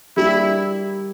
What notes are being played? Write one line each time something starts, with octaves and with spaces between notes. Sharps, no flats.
G3 A#3 D4 E4 G4